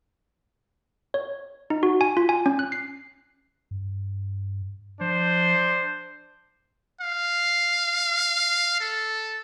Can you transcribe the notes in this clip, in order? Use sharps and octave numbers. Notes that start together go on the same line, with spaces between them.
C#5
D#4
F#4
G#5
F4
G#5
C#4
F#6
C7
G2
F3 D4 C5
F5
A4